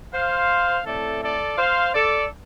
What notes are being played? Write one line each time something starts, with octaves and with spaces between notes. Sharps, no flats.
C5 F5
A2 A3 C4 A4 D5
A4 D5
C5 F5
A4 D5